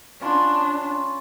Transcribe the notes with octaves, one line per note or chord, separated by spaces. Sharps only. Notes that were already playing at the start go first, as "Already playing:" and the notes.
C#4 D4 F4 B5